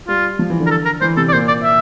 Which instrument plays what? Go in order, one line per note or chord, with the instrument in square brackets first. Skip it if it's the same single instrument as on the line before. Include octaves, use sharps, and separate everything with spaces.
[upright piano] G3 [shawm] F4
[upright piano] F3
E3
D3
[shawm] A#4
A4
A#4
[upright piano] E3 [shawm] C5
[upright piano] C3 [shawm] A4
[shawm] D5
[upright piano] A#2 [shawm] C5
[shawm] D5
E5